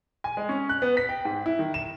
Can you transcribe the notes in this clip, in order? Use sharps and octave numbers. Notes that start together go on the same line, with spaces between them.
G#5
G#3
C#4
F#6
B3
B6
G5
G#2
E4
D#3
E7